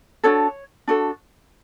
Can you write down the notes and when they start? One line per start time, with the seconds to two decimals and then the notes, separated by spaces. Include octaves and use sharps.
0.23 D4 F#4 A4 C#5
0.88 D4 F#4 A4